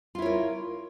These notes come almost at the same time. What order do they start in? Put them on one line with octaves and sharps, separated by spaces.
F4 E4 C#5 A#4